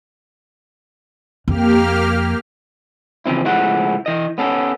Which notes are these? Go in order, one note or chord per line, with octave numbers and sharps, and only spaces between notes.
F2 A#3 G4 F6
C#3 E3 F3 C4 E4
C#2 A2 F3 E4 G#4 F#5
E3 D#5
B3 C#4 A4